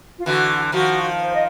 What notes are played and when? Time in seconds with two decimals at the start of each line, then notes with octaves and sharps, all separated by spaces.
0.18 F4
0.26 D3 E3 F#4
0.72 D#3 F3 F#4
1.19 C5
1.34 D#5